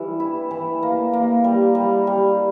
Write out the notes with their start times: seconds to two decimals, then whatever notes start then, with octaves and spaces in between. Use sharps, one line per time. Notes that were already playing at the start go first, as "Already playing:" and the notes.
Already playing: E3 G3
0.20 E4
0.51 E3
0.83 A#3
1.13 A#3
1.44 G3
1.75 G3
2.07 G3